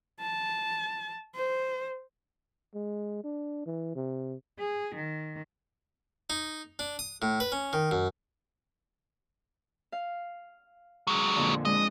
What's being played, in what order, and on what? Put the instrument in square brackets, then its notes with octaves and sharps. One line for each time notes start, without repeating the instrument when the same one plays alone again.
[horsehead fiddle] A5
C5
[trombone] G#3
D4
E3
C3
[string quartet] G#4
D#3
[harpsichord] D#4
D4
D#6
A2
B4
C#4
D#3
F#2
[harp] F5
[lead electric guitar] F#3 G#3
[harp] F2 A#2 D3
[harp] G#3 D4 [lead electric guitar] D#5